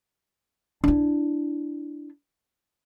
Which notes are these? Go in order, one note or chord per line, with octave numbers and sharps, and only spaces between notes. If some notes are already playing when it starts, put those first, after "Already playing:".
D4 E4